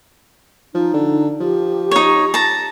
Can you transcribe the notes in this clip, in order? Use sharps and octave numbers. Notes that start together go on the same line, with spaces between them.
F3 D#4
D3
F3 G4
D#4 C#5
A5 A#5